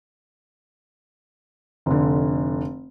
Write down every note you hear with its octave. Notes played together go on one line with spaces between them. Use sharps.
F1 D3